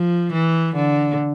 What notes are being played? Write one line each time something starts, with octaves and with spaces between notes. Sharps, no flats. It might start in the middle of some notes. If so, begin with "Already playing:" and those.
Already playing: F3
E3
D3